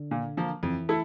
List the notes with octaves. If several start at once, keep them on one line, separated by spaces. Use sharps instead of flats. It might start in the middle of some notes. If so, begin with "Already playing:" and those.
Already playing: D3
A#2
F3 A#3
F2 E3
A3 E4 A4